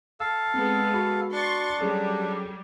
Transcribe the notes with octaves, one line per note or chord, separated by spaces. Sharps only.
A4 F5 E6
G#3 B3 C4
F#4 B5
D4 C6 C#6 A6
F#3 G3 C#4 G#4 A4